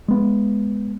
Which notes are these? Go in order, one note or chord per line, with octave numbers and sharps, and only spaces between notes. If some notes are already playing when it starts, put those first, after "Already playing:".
G#3 B3